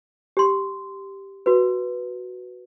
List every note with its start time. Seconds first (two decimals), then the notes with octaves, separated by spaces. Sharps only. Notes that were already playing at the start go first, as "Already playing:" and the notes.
0.37 G4 C6
1.46 F#4 B4